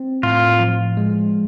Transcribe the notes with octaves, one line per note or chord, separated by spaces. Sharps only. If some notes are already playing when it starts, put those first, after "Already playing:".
Already playing: C4
A2 F4
F3
G#3